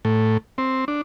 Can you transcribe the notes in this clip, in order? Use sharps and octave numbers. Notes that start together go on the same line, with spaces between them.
A2
C4
D4